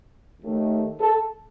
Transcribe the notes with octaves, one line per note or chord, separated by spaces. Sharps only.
D#2 D#3 A3
A4